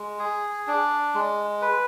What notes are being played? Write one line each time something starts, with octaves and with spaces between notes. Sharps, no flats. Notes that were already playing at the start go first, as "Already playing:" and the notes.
Already playing: G#3
G#4
D4
G#3
B4